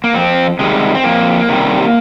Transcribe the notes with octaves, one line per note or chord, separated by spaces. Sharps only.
A#3
F2 C4
C3 D#3 G3 G#3
C4
F2 A#3
C3 D#3 G3